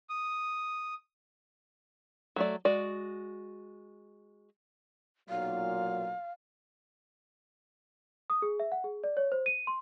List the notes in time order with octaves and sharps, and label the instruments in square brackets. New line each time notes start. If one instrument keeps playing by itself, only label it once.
[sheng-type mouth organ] D#6
[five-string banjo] F#3 A3 D5
G#3 F#4 D5
[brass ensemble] B1 A#2 F#3 [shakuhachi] F5
[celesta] D#6
G#4
E5
F#5
G#4
D5
C#5
C5
D#7
C6